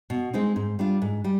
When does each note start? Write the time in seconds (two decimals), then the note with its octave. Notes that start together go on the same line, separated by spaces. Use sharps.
0.10 B2
0.33 G#3 C4 D#4
0.56 G#2
0.79 G3 D4 F4
1.02 G#2
1.24 G3